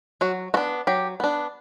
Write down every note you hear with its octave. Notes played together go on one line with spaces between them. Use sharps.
F#3 F#4
B3 D4 F#4
F#3 G4
B3 D4